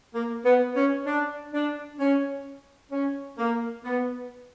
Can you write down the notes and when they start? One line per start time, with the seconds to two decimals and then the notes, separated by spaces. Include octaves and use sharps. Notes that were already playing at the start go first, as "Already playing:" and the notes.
0.15 A#3
0.45 B3
0.76 C#4
1.06 D4
1.53 D4
1.99 C#4
2.92 C#4
3.38 A#3
3.84 B3